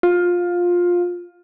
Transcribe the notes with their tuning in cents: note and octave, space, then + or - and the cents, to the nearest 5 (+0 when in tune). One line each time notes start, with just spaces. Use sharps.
F4 +15